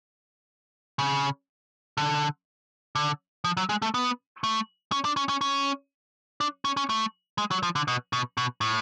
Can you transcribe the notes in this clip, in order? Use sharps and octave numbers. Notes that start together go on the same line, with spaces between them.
C#3
D3
D3
F3
F#3
G#3
A3
B3
A3
C#4
D4
C#4
C#4
C#4
D4
C#4
C#4
A3
G#3
F#3
F3
D3
B2
B2
B2
A2